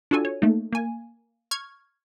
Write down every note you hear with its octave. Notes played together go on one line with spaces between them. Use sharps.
D4 F4 F#4 A4 G#5
C#5
A3 A#3 D#4
A#3 G#5
C#6 F6 G#6